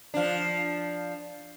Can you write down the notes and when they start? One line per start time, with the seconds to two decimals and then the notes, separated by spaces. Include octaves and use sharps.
0.14 F3 D4